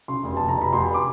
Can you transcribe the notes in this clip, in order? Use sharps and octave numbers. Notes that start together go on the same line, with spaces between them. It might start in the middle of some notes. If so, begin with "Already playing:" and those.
C#3 C6
F1
F1 A5
A#5
F1 B5
F1 C6
D6